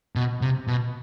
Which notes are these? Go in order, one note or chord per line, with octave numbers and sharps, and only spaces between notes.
B2
C3
B2